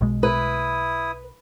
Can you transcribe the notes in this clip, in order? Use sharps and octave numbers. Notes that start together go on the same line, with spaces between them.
B1 B2 G#3
E4 B4 D#6